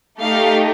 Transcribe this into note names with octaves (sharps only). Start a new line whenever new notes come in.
A3 D#4 G4 F5